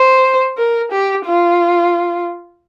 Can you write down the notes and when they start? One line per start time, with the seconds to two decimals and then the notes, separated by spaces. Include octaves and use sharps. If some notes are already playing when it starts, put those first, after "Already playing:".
Already playing: C5
0.58 A#4
0.91 G4
1.26 F4